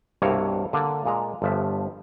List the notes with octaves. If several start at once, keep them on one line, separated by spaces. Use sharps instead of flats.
C2 G2 B2 A#3 C4 C#5
D3 A#3 D5
A#2 G#3 A#5
G1 G2 F3 E5